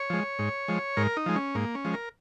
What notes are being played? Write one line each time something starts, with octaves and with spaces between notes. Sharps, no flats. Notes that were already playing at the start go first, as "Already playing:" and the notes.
Already playing: C#5
F3 G#3
G#2
F3 G#3
G#2 A#4
D#4
F3 G#3
C#4
G#2 A#3
C#4
F3 G#3
A#4